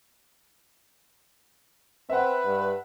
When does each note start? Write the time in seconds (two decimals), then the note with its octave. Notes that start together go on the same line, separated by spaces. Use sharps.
2.10 C4 B4 E5 F#5
2.45 G2